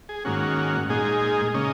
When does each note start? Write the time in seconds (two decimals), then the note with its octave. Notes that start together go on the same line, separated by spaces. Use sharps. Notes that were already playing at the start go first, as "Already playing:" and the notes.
0.09 G#4
0.25 G#2 D#3 A#3 C#4 F#4
0.90 A#2 G#3 D#4 G#4
1.54 C#3 A#3 C#4 D#5